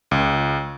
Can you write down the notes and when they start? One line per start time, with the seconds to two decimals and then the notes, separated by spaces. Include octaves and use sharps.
0.11 C#2